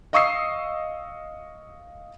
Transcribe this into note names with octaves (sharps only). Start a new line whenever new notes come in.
D#5 F5 C#6 D#6 E6 C7